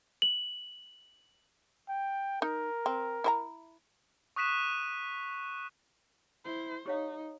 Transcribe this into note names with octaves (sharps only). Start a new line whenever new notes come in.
F#7
G5
D#4 A#4
C4
E4 C5 A#5
C#6 D#6 F#6 B6 D#7 E7
E4 C5
D#4 G4 C#5 F5